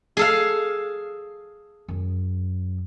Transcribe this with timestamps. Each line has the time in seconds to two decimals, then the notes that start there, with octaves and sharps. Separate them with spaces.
0.17 G#4 A4 F5
1.88 F#2